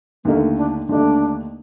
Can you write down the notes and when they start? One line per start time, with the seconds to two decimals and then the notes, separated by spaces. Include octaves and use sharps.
0.25 D#2 D3 A3 A#3 D#4
0.57 D4
0.88 D#2 D3 A3 D4 D#4